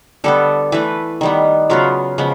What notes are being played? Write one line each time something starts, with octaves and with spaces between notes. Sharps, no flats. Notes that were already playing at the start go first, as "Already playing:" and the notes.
D3 G3 B3 A4
E3 A3 B4
D#3 G3 B3
C#3 F#3 B3 F4
C#3 F3 G#3 B3